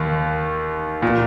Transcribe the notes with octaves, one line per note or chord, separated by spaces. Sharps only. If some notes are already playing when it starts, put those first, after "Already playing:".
Already playing: D#2 D#3
A#2